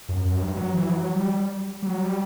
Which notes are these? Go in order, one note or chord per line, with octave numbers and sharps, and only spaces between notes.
F#2
F#2
G2
F#3
E3
F#3
F#3
G3
G3
F#3
G3